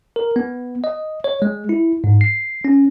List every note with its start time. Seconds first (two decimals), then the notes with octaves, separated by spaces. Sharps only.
0.16 A#4
0.36 B3
0.84 D#5
1.24 C#5
1.42 G#3
1.69 E4
2.04 G#2
2.21 C7
2.65 C#4